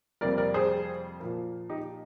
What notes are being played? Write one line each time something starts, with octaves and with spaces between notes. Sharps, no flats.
F2 C3 G3 A#3 A#4 D5
A#4 D5
G#4 C5
A#2 F3 A#3
D#4 G4